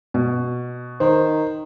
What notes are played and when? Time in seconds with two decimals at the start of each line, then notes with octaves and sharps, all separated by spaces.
0.14 B2
1.00 D#3 C5